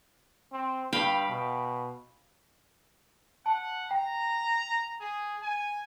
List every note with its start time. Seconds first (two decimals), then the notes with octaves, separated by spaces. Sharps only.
0.52 C4
0.93 G2 F5 G5 B5
1.29 B2
3.46 F#5 A5
3.91 G5 A#5
5.01 G#4
5.42 G#5